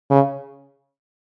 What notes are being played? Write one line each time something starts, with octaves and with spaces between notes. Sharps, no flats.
C#3